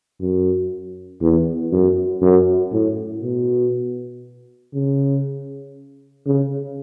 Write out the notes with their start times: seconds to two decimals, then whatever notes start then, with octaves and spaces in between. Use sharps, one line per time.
0.21 F#2
1.21 E2
1.72 F#2
2.22 F#2
2.72 A2
3.23 B2
4.74 C#3
6.26 C#3